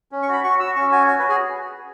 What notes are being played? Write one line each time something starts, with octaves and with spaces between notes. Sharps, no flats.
C#4
C#6
F#4 B5
F#4 C#6
F#4 E6
C#4 C#6
F#4 G#5
F#4 G#5
B4
F#4
G#4